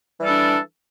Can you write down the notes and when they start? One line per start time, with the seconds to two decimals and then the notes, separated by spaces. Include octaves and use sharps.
0.19 E3
0.22 G3
0.25 A4
0.28 D4